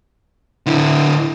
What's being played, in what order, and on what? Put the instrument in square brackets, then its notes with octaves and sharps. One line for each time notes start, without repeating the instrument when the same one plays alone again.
[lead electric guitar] D3 E4